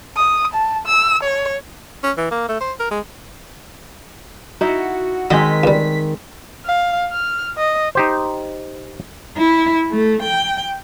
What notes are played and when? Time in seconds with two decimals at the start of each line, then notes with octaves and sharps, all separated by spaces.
0.16 D#6
0.54 A5
0.86 E6
1.23 C#5
2.04 C#4
2.17 E3
2.31 A#3
2.49 A3
2.61 C5
2.80 A#4
2.91 G#3
4.61 D#4 E4 F#4
5.31 D#3 F#3 G#3 C4 D#5 B6
5.64 C#2 G3
6.65 F5
7.12 F6
7.57 D#5
7.95 D#4 G4 C5
9.37 E4
9.91 A3
10.23 G5